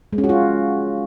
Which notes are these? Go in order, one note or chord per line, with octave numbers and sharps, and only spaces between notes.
G#3
C#4
F#4
F4